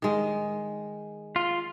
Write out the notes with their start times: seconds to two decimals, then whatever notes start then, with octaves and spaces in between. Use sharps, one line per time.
0.02 D#3 G#3
1.36 F4